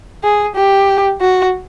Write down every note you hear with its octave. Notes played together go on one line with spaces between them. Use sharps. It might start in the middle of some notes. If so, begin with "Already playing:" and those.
G#4
G4
F#4